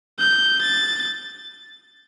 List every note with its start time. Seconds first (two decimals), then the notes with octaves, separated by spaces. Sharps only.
0.19 G6
0.62 A6